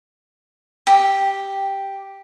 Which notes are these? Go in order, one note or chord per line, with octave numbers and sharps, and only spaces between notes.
G4